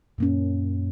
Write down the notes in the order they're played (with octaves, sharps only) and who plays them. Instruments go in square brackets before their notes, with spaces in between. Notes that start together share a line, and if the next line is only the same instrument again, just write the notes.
[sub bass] F#2 [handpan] A#2 A#3 C#4